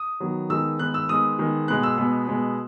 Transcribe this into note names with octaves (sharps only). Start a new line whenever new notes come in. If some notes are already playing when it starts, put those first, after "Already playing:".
Already playing: D#6
D#3 F#3 B3
D#3 G#3 B3 E6
D#3 G#3 B3 F#6
E6
D#3 G#3 B3 D#6
D#3 G#3 B3
B2 G#3 B3 F#6
E6
B2 G#3 B3
B2 G#3 B3